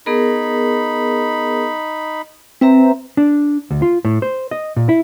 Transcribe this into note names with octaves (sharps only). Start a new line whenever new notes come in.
B3 D#4 G#4 A#4 B5
C4 B4 E5 A#5
D4
D2
F4
A2
C5
D#5
A#2
E4